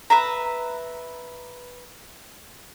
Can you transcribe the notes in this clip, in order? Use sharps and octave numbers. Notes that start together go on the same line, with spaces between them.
B4 E5 A#5